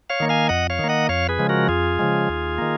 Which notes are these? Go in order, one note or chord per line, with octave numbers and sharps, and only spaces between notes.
C#5 F5
D#3 A#3
F5 G#5
F2 D#5 F#5
C#5 F5
D#3 A#3
D#5 F#5
F2 C#5 F5
G#4 B4
C#3 F3 G#3
F#4 A#4
F2 F4 G#4
C#3 F3 G#3
D#2
D#3 A#3